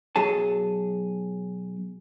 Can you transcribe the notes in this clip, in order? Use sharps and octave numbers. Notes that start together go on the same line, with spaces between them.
B1 F#3 G#4 A5